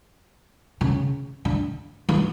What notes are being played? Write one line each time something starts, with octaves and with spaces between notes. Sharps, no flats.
C#3
D3
E3